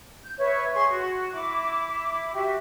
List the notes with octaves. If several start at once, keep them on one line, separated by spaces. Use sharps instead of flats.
G6
B4 C#5 E5
G#4 C6 C#6
F#4
E4 D6
F#4 G4 E5